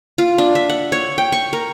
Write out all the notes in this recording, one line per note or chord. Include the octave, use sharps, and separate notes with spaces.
F4
D4
E5
F#5
C#5
G5
C#6
A#4